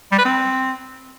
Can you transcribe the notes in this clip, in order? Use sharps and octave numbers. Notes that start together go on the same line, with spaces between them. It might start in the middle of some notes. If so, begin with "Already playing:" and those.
G3
B4
C4